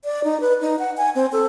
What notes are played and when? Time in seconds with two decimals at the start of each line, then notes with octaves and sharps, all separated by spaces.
0.05 D5
0.24 D#4
0.40 B4
0.61 D#4
0.79 F#5
0.97 G#5
1.15 C4
1.32 A4